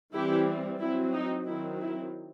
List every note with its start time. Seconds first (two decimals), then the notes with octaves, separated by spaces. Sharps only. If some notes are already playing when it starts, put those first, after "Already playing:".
0.13 E3 G3 C4 E4 G4
0.80 F#3 C4 E4
1.13 D#4
1.47 D#3 F#3 C4 E4
1.81 E4